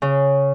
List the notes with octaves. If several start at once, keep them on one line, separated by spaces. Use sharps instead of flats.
C#3